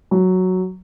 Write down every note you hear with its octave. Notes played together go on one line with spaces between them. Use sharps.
F#3